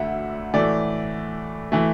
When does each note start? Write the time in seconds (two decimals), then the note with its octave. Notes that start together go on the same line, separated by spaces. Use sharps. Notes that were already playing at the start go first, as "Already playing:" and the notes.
Already playing: D2 D3 A3 E5 F#5
0.54 A2 E3 A3 D5
1.72 E3 A3